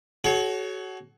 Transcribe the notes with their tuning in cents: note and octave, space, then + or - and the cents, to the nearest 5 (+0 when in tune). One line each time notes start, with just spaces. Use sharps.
F#4 +20 A4 -45 C#5 +0